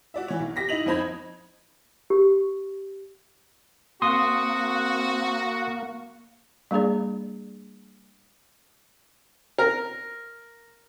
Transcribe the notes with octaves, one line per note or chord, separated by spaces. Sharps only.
F#4 D5 E5
E3 C#5
B1
G4 A#6 B6
D#4 E4 D#5 F7 F#7
F2 D#4 C5 B5 G#6
G4
A#3 C4 F#4 C6 D#6
G3 A#3 D4 G#4 D5
A#4